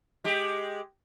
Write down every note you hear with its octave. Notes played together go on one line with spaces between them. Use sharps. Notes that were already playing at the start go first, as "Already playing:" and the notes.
G#3 G4